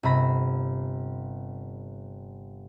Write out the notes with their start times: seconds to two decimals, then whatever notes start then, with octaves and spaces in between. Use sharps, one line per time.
0.03 G1 C3 B5 A#6